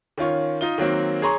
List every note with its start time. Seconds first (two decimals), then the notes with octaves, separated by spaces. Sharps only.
0.18 D#3 C#4 F4 C#5
0.61 D#4 F4 G7
0.78 D#3 F#3 A#3 C4
1.22 G#4 C#5 A#5 C6 C#6